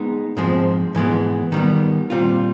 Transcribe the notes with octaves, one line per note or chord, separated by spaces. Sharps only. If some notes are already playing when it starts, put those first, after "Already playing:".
Already playing: G#3 B3 D#4
G#2 F3 G#3 C4
G#2 E3 G#3 B3
D#3 G3 B3
A#2 G3 C4 F4